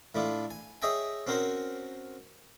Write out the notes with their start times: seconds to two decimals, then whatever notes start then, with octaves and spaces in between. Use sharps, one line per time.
0.15 A2 A3 D4 E4 F4
0.51 G#5
0.82 G#4 C#5 D#5 E5 G5 G#5
1.27 C4 C#4 F#4 A#4 C5 C#5